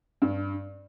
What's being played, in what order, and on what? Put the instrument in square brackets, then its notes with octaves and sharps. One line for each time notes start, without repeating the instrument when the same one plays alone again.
[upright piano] G2